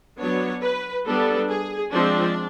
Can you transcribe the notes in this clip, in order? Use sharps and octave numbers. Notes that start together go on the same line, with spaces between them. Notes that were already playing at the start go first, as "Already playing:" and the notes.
F#3 B3 D4 C#5
B4
G3 B3 D4 A4
G#4
F3 G#3 C4 D4